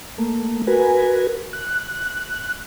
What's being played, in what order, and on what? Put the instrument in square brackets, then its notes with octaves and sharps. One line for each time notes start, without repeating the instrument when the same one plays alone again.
[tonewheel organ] A3 A#3
F#4 A#4 B4 G#5
F#6